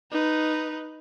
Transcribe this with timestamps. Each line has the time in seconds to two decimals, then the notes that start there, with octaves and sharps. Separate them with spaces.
0.11 D#4 B4